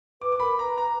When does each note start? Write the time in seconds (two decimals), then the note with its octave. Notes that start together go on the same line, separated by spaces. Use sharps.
0.21 B4 D6
0.32 D6
0.40 A#4 B5
0.59 B4 A#5
0.78 A#5